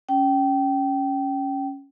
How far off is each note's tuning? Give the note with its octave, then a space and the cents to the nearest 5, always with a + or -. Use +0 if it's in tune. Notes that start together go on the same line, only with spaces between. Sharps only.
C#4 +0 G5 -20